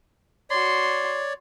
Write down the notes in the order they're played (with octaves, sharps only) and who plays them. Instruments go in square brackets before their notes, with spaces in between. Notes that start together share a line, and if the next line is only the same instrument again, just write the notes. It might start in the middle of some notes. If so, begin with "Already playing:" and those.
[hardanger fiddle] F#4 C6 [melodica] C#5 D5